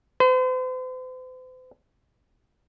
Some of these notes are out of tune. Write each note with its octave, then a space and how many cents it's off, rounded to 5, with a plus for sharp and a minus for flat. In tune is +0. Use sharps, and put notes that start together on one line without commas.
C5 -45